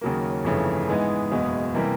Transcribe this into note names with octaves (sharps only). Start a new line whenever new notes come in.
D#2 C#3 F#3 A#3
G1 F2 C#3 E3 A3
G#2 E3 G#3 B3 D#4
F#1 E2 B2 G#3 B3
C3 E3 G3 A#3